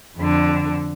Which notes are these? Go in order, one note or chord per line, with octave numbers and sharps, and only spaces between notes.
F2 D3